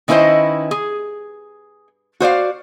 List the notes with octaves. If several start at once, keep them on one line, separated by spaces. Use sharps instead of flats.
D#3 C#4 E4 B4 C5 D#5
G#4
F#4 C5 D5 F5